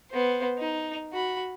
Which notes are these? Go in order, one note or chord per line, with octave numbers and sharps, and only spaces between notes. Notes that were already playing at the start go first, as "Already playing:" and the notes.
B3 C5
D#4
F#4 B5